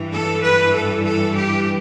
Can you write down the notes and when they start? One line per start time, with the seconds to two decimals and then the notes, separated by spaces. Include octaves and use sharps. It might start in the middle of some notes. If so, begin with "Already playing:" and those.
Already playing: G2 E3 G3
0.13 A4
0.43 B4
0.74 A4
1.05 A4
1.36 G4